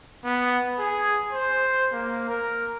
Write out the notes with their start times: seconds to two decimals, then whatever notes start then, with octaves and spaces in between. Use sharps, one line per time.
0.24 B3
0.79 G#4
1.32 C5
1.93 A#3
2.29 A#4